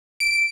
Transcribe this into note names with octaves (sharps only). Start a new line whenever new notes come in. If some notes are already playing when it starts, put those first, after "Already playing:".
D7